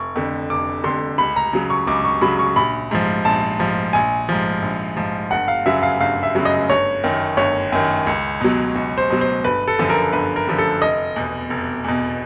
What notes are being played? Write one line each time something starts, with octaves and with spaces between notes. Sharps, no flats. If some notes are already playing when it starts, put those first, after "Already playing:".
Already playing: F1 C#6
F2 D3
F1 D6
F2 D3 C6
C#2 B5
A#5
C#3 F#3
C#6
C#2 D6
C#6
C#3 F#3 B5
C#6
A#1 B5
G#2 F3
A#1 A5
G#2 F3
A#1 G#5
G#2 F3
A#1
G#2 F3
G1 F#5
F5
F#2 C#3 F#3 E5
F5
G1 F5
E5
F#2 C#3 F#3
D#5
G1 C#5
F#2 D#3
G1 C#5
F#2 D#3
C#2
B2 F#3
C#2
C5
B2 F#3
C5
G1 B4
A4
F#2 D3 F3
A#4
G1 B4
A#4
F#2 D3 F3
A4
F1 D#5
E2 B2
F1
E2 B2